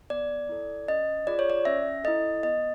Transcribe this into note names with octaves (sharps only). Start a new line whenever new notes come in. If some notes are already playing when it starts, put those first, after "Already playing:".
B3 D5
E4 A4
C#4 D#5
F4 G#4 D5
C#5
D5
C#4 E5
E4 A4 D#5
B3 D#5